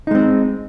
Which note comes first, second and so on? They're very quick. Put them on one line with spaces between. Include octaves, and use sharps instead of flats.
D#4 G#3 C4